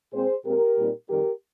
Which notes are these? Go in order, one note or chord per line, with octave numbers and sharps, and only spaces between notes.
A#2 G#3 C4 G#4 C5
A#2 G#3 C4 G4 A#4
A#2 G3 C4 D#4
F2 D#3 G3 G4 A#4